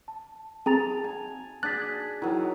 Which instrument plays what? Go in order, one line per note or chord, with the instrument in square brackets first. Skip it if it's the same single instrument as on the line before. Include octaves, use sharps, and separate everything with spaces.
[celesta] A5
[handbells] C4 G#4 A#5 [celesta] A5 A6 F7
[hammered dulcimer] G#5
[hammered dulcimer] D4 G#4 [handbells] F#6 [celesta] A6 B6
[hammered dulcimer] D#3 F#3 [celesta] E4